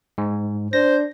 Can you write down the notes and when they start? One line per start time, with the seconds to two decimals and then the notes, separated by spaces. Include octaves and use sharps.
0.18 G#2
0.73 D4 C5 A#6